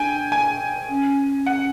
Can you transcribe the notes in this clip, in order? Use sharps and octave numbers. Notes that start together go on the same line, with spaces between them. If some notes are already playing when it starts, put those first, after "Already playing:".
Already playing: D4 G5 G#5
G#5
C#4
F#5